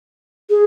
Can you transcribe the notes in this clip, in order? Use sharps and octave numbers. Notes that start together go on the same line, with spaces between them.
G#4